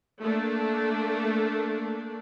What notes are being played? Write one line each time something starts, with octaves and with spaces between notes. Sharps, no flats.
A3 A#3 D4